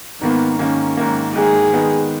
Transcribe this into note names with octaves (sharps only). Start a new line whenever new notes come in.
G#2 D#3 A#3 B3
G#2 D#3 A#3 C#4
G#2 D#3 A#3
G#2 D#3 A#3 G#4
D#3 G#3 B3